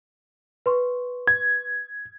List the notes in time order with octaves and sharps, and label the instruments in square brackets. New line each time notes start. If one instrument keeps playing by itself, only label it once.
[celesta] B4 C6 C#6
[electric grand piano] G#6